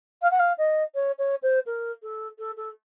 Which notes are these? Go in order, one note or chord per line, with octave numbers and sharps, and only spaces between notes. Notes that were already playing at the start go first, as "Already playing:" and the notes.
F5
F#5
F5
D#5
C#5
C#5
C5
A#4
A4
A4
A4